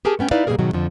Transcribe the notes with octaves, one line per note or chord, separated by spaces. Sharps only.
G4 G#4 A#4 G#5 A5
A3 B3 C#4 G5
D#4 E4 B4 D5 F5
B2 G3 A3 A#3 G#4 A#4
G#2 B2 D#3 F#3 G#3
F2 D3 F3